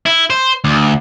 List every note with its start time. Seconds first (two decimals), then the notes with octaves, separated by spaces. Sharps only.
0.06 E4
0.30 C5
0.64 D2